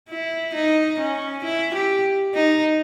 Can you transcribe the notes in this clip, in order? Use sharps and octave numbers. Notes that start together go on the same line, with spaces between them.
E4
D#4
C#4
E4
G4
D#4